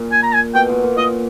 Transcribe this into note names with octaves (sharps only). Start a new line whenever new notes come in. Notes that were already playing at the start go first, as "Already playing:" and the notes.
Already playing: A#2
G#5
A#5
G#5
B2 G5
A#2
A#2
A#2 D#5